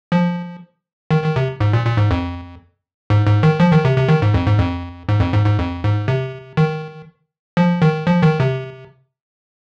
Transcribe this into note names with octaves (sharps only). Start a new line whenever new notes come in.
F3
D#3
D#3
C3
G#2
A#2
A#2
G#2
F2
G#2
G#2
D#3
F3
D#3
C3
C3
D#3
G#2
F2
G#2
F2
G#2
F2
G#2
G#2
F2
G#2
C3
D#3
F3
D#3
F3
D#3
C3